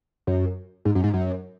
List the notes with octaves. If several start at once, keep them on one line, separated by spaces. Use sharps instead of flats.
F#2
G#2
F#2
G#2
F#2